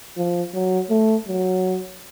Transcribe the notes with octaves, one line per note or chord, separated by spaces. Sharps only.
F3
F#3
A3
F#3